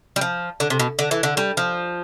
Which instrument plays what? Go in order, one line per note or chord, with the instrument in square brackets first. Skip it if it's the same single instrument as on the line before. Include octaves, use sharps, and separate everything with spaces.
[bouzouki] G3
F3
D3
C3
B2
D3
E3
D3
G3
F3